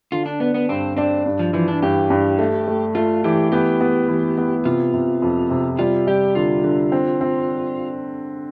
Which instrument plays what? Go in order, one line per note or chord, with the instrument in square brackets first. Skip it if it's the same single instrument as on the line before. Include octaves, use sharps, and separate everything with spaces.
[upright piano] D3 [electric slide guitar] F4
[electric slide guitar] D4
[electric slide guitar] B3 [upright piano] D4
[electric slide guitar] B3
[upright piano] G2 [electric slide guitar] C4
[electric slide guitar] C4 [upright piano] D4
[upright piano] G2
[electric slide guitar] F3
[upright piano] E3 [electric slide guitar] F3
[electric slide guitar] D4
[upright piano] G2 [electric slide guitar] G4
[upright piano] G2
A3
A3
[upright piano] A3 [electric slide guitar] F4
[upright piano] E3 [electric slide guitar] G4
[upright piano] B3 [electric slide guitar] G4
[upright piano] B3
E3
B3
[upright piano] C3 [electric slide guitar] F4
[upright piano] C3
F2
C3
[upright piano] G3 [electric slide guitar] F4
[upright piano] G3 [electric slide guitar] G4
[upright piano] D3 [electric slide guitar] F4
[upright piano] D3
C4
C4